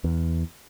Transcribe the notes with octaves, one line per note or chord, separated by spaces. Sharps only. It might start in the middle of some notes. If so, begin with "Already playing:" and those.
E2